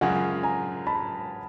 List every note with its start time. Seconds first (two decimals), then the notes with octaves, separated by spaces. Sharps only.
0.01 F#2 C#3 F3 G#3 F#5 G#5
0.43 G#5 A#5
0.87 A5 B5